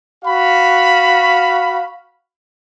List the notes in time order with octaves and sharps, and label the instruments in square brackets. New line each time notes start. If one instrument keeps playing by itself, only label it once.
[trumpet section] F#4 F5 B5